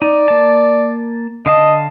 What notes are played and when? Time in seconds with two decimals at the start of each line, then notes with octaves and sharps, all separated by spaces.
0.02 D#4 D5
0.28 A#3 A5
1.46 D3 D#5 F5 A5